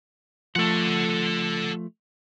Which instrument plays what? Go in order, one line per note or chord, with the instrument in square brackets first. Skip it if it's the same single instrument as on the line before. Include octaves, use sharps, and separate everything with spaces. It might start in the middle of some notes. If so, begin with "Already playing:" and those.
[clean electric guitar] F3 A3 [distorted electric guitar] A4 F#5